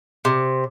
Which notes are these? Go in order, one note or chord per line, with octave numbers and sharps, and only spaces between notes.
C3